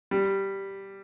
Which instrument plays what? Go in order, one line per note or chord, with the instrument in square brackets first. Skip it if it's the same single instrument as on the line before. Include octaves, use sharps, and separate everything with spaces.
[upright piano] G3